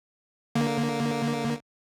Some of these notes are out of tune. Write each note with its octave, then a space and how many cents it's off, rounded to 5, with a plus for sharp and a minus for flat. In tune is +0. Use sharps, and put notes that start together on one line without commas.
D3 -10 A#3 +0